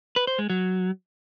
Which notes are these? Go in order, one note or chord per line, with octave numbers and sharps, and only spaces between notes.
B4
C5
G#3
F#3